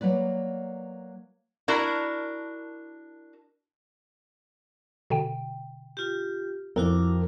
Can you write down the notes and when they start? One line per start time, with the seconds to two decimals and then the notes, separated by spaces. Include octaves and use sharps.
0.01 F#3 A#3 B4 D5
1.68 D4 E4 F#4 A#4
5.10 B2 D3 G5
5.97 F4 G4
6.76 F2 E4 F#4 A#4 D6